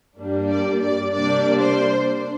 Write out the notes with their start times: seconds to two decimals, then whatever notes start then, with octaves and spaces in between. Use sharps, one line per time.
0.18 G2 G3 A#3 D4
0.50 D5
0.81 D5
1.13 C3 G3 A#3 D4 D5
1.60 C5
2.07 D4